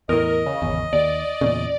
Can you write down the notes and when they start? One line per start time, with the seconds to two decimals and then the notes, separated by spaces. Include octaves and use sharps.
0.09 E2 A2 A#4 D#5
0.46 C#3
0.62 G#1 E2
0.93 D#2 D5
1.41 E2 A#2 C#3